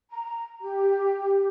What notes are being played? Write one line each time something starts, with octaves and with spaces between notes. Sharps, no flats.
A#5
G4